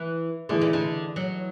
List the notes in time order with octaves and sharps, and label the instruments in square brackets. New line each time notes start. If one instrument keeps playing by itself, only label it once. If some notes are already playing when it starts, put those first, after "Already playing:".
Already playing: [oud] E3
[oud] D3 [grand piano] E3 A3 E4 G#4
[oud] C#3
D3
F#3